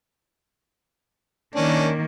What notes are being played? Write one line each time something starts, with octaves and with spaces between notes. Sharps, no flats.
D#3 A#3 C#4 D4